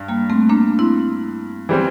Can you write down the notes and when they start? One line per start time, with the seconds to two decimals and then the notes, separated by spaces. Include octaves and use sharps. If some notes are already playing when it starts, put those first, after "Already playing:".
Already playing: G2
0.08 G3 A#3
0.30 A3 C4
0.49 A#3 D4
0.79 C4 E4
1.69 E3 G3 C4